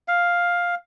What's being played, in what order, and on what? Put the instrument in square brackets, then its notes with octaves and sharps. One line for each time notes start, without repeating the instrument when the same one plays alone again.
[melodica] F5